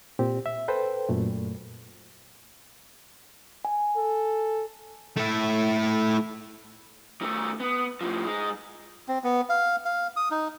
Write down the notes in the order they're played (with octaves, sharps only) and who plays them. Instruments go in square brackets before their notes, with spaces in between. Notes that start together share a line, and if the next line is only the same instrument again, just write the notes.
[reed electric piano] A#2 C4 G4
E5
A4 B4 C5 G5
F#2 A#2 A3
[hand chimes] G#5
[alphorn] A4
[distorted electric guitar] A3 E4
[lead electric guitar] D#3 A3
B3
A2 F3
G#3 D#4
[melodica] C4
B3
F5
F5
D#6
D#4